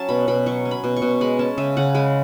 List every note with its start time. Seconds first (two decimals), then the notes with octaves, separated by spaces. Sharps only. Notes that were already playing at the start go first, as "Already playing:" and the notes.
Already playing: F#3 C#4 A5
0.09 B2 B5
0.28 B2 B5
0.46 F#3 C#6
0.65 C#4
0.71 B5
0.84 B2
0.97 C#6
1.02 B2
1.21 G#3 B5
1.39 C#4 A5
1.58 C#3 E5
1.77 C#3 F#5
1.95 G#3 B5